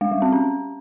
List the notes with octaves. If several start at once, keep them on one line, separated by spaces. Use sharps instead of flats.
G#3
G3
C4
C#4